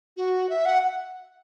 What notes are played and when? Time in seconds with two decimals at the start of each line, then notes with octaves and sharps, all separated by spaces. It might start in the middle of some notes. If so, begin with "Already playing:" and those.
0.17 F#4
0.49 E5
0.65 F#5